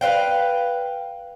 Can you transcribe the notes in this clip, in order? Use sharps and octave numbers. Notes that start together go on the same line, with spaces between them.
B4 C5 F5 G5